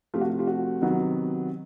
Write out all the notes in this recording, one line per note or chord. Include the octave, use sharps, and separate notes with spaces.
C3 F3 A3 F4 G4
F#4
F4 G4
F#4
C3 D#3 F#3 B3